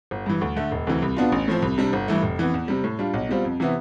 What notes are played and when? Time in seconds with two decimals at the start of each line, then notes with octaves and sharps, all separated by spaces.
0.11 G1
0.26 G2 E3
0.41 D2
0.56 D3 A3
0.71 E1
0.87 D2 C3 E3
1.02 C2
1.17 B2 B3 D4 F4
1.32 A1
1.48 A2 F3 C4
1.62 C2
1.78 C3 G3 D4
1.93 G1
2.08 G2 E3 A3
2.23 F1
2.38 F2 E3 B3
2.54 E2
2.68 C3 G3
2.84 A2
2.99 G3 D4 F4
3.14 B1
3.29 B2 G3 C4 F4
3.45 F2
3.60 C3 E3 B3 E4